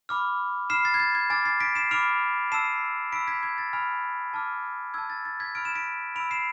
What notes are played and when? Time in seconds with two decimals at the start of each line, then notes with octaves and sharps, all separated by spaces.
0.09 B5 D6 F6
0.70 B5 F6 C7 E7
0.85 A6 C7
0.94 G#6
1.00 A6
1.15 G#6
1.30 G#5 D6 F6 A6
1.45 A6 C7
1.60 B6 D7
1.75 C7 E7
1.91 B5 D6 F6 D7 F7
2.52 A5 E6 C7 E7
3.12 B5 B6 D7
3.15 E6
3.28 G#6 B6
3.43 G#6
3.58 A6
3.73 G#5 B5 F6
4.33 A5 D6 F6
4.94 A5 E6 G#6
5.10 A6
5.25 A6
5.40 G#6 B6
5.55 B5 F6 D7
5.65 E7
5.75 B6 D7
6.16 B5 D7 F7
6.20 E6
6.31 C7 E7